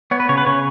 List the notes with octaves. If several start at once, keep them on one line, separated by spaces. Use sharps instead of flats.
B3 C#5
B4
C#3 C#5
B4
C#3 C#5